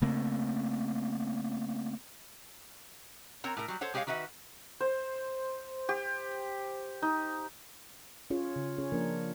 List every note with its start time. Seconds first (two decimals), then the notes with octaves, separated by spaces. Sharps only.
0.02 C#3 A3 A#3 C4
3.44 C4 A#4 C#5 F#5 A#5
3.57 A2 A#4
3.68 F#3 G3
3.81 A4 C5 C#5 F#5
3.94 G#3 G4 G#4 B4 C#5 F5
4.07 D#3 F#4 B4 E5 F#5
4.81 C5
5.89 G4
7.02 D#4
8.30 C#4 F4 G#4 C#5
8.56 C#3
8.78 C#4 G#4 C#5
8.92 F3 A#3 D4 A#4